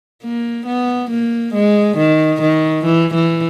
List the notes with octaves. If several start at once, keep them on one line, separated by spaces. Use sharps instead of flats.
A#3
B3
A#3
G#3
D#3
D#3
E3
E3